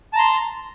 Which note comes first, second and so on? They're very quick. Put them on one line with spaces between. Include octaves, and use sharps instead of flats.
A5 A#5 C6